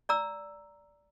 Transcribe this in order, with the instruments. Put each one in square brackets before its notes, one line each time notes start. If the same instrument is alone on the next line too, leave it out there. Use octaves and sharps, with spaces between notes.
[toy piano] D5 A#5 E6